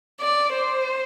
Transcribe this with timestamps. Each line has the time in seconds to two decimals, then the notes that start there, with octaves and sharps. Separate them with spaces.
0.21 D5
0.53 C5